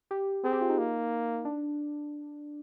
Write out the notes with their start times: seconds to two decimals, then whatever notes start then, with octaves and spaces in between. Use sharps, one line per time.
0.11 G4
0.44 C4 G#4
0.53 G4
0.61 F4
0.70 D#4
0.78 A#3
1.45 D4